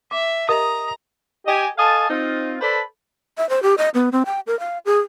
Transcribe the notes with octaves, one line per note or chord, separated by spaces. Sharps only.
E5 D6
G4 A#4 D#5 A#5 D#6
G4 D#5 G#5
A4 D#5 F5 G#5 A5
C4 D#4 F4
A4 B4 C5 D5 A5 B5
E5
C5
G4
D#5
B3
C4
G5
A#4
F5
G#4